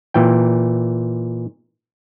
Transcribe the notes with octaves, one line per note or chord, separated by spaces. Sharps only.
A#2 E3 G5